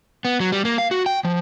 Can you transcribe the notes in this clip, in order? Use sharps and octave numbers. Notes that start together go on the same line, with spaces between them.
B3
F#3
G3
A#3
F5
F#4
G5
F3